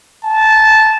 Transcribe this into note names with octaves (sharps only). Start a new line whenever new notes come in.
A5